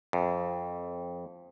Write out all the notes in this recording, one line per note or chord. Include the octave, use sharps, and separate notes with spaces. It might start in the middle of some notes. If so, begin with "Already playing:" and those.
F2